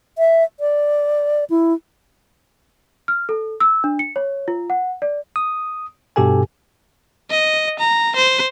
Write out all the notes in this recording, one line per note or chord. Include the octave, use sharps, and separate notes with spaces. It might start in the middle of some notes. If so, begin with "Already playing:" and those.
E5
D5
E4
F6
A4
E6
D4
C#7
C#5
F4
F#5
D5
D#6
G2 B2 G4 A4 G#5
D#5
A#5
C5